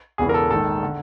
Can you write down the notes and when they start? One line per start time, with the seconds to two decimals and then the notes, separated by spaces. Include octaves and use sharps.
0.18 E1 E2 C#3 E3 G#4
0.29 A#4
0.34 A4
0.50 A#1 G#2 D#3 A4
0.83 D3